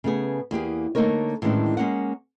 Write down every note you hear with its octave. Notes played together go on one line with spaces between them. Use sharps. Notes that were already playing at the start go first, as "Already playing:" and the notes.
C#3 A3 B3 G#4
E2 A#3 G4 G#4
D3 A3 A#3 D#4 A#4 C#5
A2 D#3 E3 G#3 C#4 D4
G#3 A#3 C#4 F#5